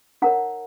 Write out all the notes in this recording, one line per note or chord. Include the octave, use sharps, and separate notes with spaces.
D#4 A#4 C#5 F#5 A#5